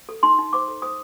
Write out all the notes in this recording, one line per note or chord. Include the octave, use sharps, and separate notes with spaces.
A4
D#4 C6
D#4
C5 D6
A4
C5 D#6